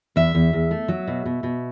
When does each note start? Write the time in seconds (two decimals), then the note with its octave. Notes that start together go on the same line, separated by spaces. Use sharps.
0.16 E2 E5
0.35 E2
0.53 E2
0.71 A3
0.88 F#3
1.07 B2
1.26 B2
1.43 B2